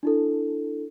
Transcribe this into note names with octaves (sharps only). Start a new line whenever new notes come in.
D4 E4 A4